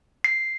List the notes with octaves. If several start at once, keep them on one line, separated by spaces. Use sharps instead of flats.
C7